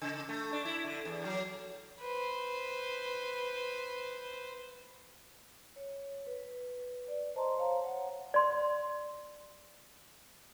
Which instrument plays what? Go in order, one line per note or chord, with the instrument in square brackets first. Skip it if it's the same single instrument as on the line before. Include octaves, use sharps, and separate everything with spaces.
[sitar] C#3
A3
D4
E4
D3
E2
F#3
[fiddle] B4 C5
[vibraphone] C#5
B4
D5
C5 D#5 A5 A#5 C6
C5 C#5 F5 A5 A#5
C#5 F#5
[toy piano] D5 C6